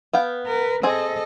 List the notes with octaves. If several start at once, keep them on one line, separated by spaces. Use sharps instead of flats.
B3 F5 G5
A#4 B4
C4 G#4 A4 D#5